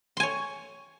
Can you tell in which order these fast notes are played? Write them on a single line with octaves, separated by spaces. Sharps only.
C6 G#5 C#5